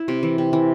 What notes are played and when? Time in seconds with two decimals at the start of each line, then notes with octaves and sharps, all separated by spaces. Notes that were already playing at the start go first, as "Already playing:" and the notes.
Already playing: E4
0.08 C3
0.23 E3
0.38 C3
0.53 E3